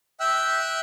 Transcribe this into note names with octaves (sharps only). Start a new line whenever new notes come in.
E5 G5 E6 F#6